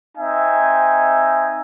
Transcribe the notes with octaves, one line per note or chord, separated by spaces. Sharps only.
C4 D#4 E5 G#5